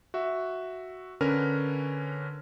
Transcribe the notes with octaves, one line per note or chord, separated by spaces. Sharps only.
F#4 E5
D3 C#4 A#4 B4 F6